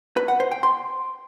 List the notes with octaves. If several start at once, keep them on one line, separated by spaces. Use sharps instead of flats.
B4
F#5
C5
G5
C6